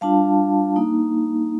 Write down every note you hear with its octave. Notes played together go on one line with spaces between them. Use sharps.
G3 D4 F4 F5 A5
A#3 D#4